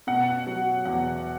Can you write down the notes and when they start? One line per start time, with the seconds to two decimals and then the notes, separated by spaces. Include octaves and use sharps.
0.07 B2 F#5
0.47 F#3
0.86 E2 F#5